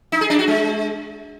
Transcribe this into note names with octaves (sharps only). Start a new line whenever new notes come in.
D#4
G#4
D4
F#4
G#3